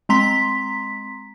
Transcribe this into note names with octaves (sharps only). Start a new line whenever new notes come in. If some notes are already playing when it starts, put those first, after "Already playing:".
G#3 C4 A#5 C6 B6